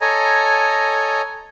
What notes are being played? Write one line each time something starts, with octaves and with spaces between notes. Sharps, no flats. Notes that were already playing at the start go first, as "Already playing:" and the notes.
A4 C#5 D#5 G#5 A#5